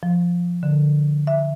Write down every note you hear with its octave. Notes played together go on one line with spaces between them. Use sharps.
F3
D3
E5